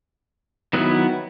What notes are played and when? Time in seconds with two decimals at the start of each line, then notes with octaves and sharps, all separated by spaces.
0.73 D#3 F#3 B3 E4